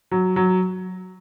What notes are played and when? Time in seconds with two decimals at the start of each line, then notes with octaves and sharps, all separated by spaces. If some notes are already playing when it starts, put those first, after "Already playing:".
0.11 F#3
0.36 F#3